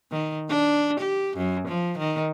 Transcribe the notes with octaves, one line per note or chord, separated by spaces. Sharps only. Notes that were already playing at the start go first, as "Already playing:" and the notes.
D#3
D4
G4
F#2
F3
D#3